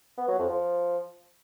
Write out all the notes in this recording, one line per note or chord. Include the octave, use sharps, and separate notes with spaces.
B3
F#3
F2
F3